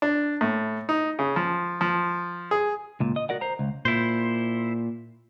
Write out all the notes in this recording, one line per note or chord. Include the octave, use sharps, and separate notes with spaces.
D4
A2
D#4
C#3
F3
F3
G#4
C#2 A#2
D#5
F#4 A#4 D5 F#5
C5 A#5
C#2
A#2 E4 C5